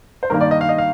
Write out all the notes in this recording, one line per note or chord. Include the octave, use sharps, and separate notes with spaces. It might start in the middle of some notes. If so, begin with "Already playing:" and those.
C5
G2 D#3 A#3 A#4
D5
D#5
F5
D#5
F5